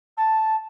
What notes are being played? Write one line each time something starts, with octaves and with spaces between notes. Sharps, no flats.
A5